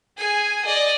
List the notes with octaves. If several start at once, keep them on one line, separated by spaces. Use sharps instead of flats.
G#4 G#5
D5 D#5